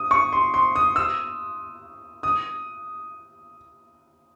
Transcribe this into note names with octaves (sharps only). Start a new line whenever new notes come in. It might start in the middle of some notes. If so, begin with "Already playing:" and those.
Already playing: D#6
C#6
C6
C6
D#6
E6
D#6